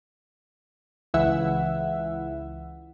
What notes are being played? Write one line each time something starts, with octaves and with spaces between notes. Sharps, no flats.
C#2 E3 E5 F#5